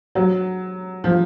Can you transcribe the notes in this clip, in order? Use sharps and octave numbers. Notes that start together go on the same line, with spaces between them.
F#3
F3